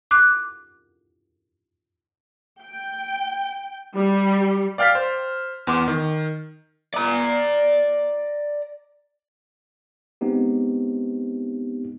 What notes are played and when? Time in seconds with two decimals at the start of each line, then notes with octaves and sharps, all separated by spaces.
0.11 D6 F#6
2.61 G5
3.96 G3
4.78 D5 F5 G5 F6 A6 B6
4.95 C5
5.67 E2 B3 C6 D6
5.88 D#3
6.94 D5 A#5
10.21 G#3 B3 C4 D#4 G4